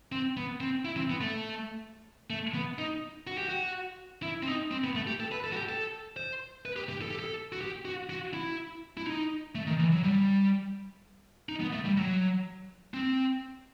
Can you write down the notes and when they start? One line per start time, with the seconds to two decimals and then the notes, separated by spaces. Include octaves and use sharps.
0.12 C4
0.37 B3
0.60 C4
0.85 E4
0.97 C4
1.10 B3
1.21 A3
2.30 A3
2.54 B3
2.78 D#4
3.27 F#4
3.38 G4
3.49 F#4
4.23 E4
4.43 C4
4.47 D#4
4.71 C4
4.84 B3
4.95 A3
5.07 G4
5.20 A4
5.32 B4
5.44 A4
5.52 F#4
5.56 G4
5.69 A4
6.17 C5
6.65 B4
6.76 G4
6.89 G4
7.02 A4
7.11 G4
7.19 A4
7.52 F#4
7.61 G4
7.85 F#4
8.10 F#4
8.34 E4
8.97 E4
9.07 D#4
9.55 A3
9.67 D#3
9.79 E3
9.92 F#3
10.04 G3
11.49 D#4
11.61 B3
11.73 A3
11.84 G3
11.97 F#3
12.94 C4